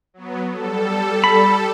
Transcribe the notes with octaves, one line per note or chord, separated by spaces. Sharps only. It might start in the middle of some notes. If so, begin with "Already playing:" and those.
F#3 B3
G3 A4
B5